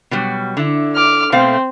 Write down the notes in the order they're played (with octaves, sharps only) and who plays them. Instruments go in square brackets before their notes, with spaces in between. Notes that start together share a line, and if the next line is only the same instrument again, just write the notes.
[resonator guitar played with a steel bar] B2 F#3 G3
D3 E4
[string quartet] D6 F6
[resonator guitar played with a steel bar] B2 A3 F5 [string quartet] C4